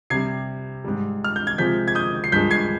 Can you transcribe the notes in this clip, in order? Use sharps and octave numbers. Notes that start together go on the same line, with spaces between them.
C3 G3 G#6 C7
G#2 G3
F6
G6
G#6
C3 F3 G#3 G6 B6
G#6
D#6 G6
C7
G2 F3 G#3 G6 B6
G#6 C7